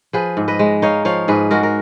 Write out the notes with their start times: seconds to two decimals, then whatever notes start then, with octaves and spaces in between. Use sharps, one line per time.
0.13 F3 G#4 B4
0.37 G#2
0.48 B4 D#5
0.59 G#3
0.82 D#4 C#5 F5
1.05 F3 C#5 F5
1.28 G#2 G#4 B4
1.51 G#3 F#4 A#4
1.63 A#4